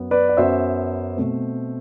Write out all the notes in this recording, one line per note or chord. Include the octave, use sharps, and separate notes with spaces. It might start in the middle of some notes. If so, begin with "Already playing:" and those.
Already playing: F#2 F#3 B3
B4 D5
D5
F#2 F#3 B3 C5 E5
B2 A3 C4